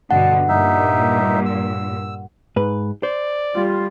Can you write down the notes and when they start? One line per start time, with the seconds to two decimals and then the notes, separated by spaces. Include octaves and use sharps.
0.11 G2 B2 D3 F#5 A5
0.48 G2 A#2 D#4 E5
1.46 E6
2.56 G#2 B4
3.03 C5 D5
3.55 G3 F4